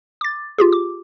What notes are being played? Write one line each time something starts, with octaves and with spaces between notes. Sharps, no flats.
D6 A6
F4 G4 G#4
D6